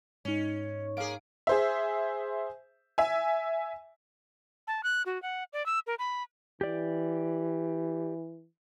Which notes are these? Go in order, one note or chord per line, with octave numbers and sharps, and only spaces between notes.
G#2 C#4 D#4
A#3 G#4 F5 D7
G#4 C5 E5
E5 G#5
A5
F#6
F#4
F#5
D5
E6
A#4
B5
E3 G4 D5